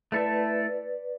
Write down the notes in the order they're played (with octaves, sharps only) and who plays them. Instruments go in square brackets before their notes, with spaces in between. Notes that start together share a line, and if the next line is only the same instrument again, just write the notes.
[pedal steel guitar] A3 E4 A4 E5 [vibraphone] B4 D5